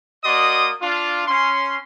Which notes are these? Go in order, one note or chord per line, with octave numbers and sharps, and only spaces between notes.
A#3 F#4 D5 D#5 C6 D#6
D4 F4
C#4 C6